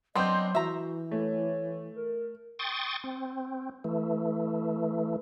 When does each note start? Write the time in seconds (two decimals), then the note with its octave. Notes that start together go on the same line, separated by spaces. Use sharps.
0.15 F#3 B3 C4 D4 D#5 C6 G6
0.55 E3 F#4 E5 A#5
1.11 A3 C#5
1.96 A#4
2.59 G5 C6 C#6 D#6 A6
3.04 C4
3.84 E3 A3